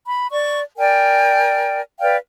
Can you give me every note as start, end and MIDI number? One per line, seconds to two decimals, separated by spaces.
0.06 0.30 83
0.31 0.59 74
0.31 0.59 85
0.77 1.81 70
0.77 1.81 74
0.77 1.81 79
0.77 1.81 80
2.00 2.17 71
2.00 2.17 74
2.00 2.17 77
2.00 2.17 79